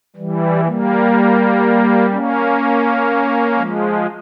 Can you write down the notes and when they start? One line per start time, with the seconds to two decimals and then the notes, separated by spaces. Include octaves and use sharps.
0.16 E3 G3
0.65 G3 A#3
2.10 A#3 C#4
3.56 F3 G#3